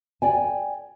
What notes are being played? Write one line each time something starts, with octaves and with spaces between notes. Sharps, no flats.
D5 G5 G#5